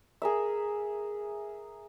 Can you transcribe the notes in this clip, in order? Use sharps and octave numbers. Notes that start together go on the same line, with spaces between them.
G#4 A#4 E5